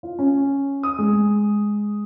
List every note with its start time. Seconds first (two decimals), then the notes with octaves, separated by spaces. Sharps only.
0.03 F4
0.19 C#4
0.83 D#6
0.99 G#3